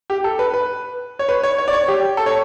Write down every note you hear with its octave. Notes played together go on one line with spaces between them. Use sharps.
G4
A4
B4
B4
C#5
B4
C#5
C#5
D5
C#5
G4
A4
C#5